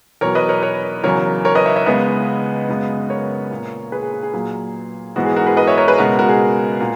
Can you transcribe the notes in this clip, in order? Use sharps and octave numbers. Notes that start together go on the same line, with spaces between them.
E2 B2 F#3 A#4 C#5
B4 D#5
A#4 C#5
A#4 C#5
E2 C#3 F#3 A#4 C#5
A#4 C#5
B4 D#5
C#5 E5
C#5 E5
C#2 C#3 G#3 B3 B4 D#5
F#2 C#3 G#3 B3
A#4 C#5
A#2 A#3
G#4 B4
G#4
G#4
G#4
A#2 F#3 A#3
G#2 E3 G#3 B3 F#4
G#4
F#4 A#4
G#4 B4
B4 D#5
C#5 E5
A#4 C#5
G#4 B4
C#2 B2 G#3 B3 F#4 A#4
F#4 A#4
G#4
A#2